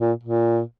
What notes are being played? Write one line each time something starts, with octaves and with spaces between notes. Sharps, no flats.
A#2
A#2